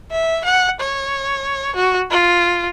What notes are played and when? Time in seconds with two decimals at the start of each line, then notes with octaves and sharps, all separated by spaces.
0.11 E5
0.44 F#5
0.80 C#5
1.75 F#4
2.11 F4